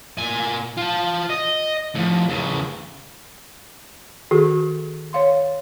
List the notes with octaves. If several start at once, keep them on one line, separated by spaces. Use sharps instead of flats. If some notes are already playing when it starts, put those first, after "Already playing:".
A#2 G#5
F4 A5
D#5
A2 F3
E2 C#3
D#3 F#4 G#4 A4
C#5 F5 C6